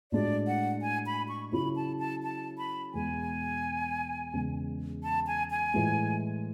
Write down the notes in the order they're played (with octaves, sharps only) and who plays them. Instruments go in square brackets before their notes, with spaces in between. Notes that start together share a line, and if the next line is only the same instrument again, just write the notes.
[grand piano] A2 G#3 D4 F#4 [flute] D5
[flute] F#5
G#5
B5
C#6
[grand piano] C#3 F#3 C#4 E4 [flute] B5
[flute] A5
A5
A5
B5
[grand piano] E2 B2 G#3 [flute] G#5
[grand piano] E2 C#3 G#3
[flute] A5
G#5
G#5
[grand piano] A2 E3 G#3